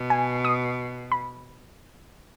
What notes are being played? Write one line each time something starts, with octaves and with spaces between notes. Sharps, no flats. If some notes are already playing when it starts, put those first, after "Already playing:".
Already playing: B2
G#5
D#6
B5